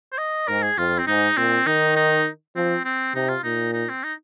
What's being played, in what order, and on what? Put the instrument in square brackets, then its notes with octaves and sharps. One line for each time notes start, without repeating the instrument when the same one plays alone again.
[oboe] C5
D#5
[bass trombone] G#2 [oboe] A#4
[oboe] G#4
[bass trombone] F2 [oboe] F4
[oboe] C4
[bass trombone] G#2 [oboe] D#4
[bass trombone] A#2 [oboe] C4
[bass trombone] D#3 [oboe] D#4
[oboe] D#4
[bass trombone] F3 [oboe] C4
[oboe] C4
[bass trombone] C3 [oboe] D#4
[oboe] F4
[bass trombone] A#2 [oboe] D#4
[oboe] D#4
C4
D#4